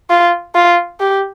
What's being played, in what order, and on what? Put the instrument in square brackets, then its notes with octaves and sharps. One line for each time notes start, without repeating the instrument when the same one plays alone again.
[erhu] F4
F4
G4